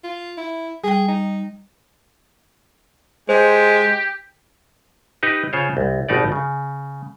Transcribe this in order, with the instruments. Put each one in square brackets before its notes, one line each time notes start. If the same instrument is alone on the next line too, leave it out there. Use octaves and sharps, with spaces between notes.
[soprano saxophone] F4
E4
[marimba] G3 G5 [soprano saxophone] G#4
[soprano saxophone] D#4
[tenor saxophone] G#3 [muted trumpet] G4 [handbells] C5
[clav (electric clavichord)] D#4 G4 B4
C#3 F4 C5 C#5
C2
G#1 B2 D#4 G4 D5
C#3